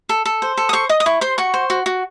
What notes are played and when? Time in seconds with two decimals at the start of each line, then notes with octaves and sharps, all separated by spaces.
0.09 A4
0.25 A4
0.42 C5
0.57 A4
0.69 D#6
0.73 C5 C#6
0.89 D#5 D#6
1.00 D#6
1.06 E4 C#6
1.21 C5 C6
1.38 F#4 C#6
1.54 C5
1.70 F#4
1.86 F#4